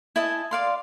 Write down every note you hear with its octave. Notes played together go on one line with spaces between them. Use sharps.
E4 D#5 G#5 A5
D5 F5 C6